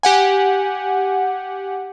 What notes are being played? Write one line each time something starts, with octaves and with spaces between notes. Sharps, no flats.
G4 F#5 G#5